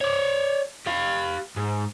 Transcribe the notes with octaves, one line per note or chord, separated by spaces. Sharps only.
C#5 D5
G4 F5
G#2